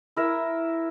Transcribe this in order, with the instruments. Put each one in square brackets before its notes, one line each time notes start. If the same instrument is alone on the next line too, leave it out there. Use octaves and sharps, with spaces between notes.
[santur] E4 A#4 E5